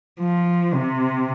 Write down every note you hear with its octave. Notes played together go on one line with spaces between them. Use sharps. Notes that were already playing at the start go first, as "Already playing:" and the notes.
F3
C3